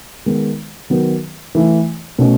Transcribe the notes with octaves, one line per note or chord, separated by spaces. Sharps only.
D#3 G#3 B3
D#3 F#3 B3
E3 A3 E4
B2 A3 C#4